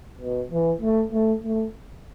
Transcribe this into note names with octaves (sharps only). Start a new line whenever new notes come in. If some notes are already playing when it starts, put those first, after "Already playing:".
B2
E3
A3
A3
A3